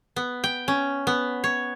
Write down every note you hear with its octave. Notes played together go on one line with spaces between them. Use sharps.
B3
G5
C#4
B3
C#5